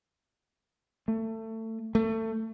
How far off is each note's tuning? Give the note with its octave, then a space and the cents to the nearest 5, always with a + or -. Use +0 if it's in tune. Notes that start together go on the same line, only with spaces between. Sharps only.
A3 +25
A3 +25